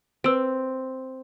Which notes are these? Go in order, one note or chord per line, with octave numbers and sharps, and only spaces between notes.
C4 B4 E6 D7